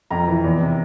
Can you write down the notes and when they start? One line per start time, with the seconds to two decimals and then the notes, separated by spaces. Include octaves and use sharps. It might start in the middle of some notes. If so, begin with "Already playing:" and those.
0.11 F2 A#5
0.27 E3
0.44 E2
0.61 C3